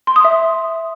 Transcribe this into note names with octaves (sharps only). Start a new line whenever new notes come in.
C6
D#6
E5